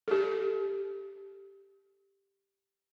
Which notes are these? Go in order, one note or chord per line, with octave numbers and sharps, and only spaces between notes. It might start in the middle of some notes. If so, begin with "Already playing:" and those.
G4 A4